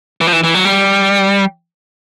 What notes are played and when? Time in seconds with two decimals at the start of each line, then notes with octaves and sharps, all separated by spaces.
0.21 E3
0.27 F3
0.32 E3
0.44 E3
0.54 F#3
0.65 G3